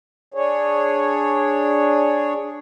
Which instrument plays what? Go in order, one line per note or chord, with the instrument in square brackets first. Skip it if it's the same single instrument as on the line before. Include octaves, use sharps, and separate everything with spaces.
[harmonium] D4 G#4 C#5